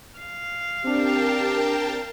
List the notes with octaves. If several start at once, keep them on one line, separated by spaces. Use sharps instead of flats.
F5
C4 D4 G4 A#4 G5 A5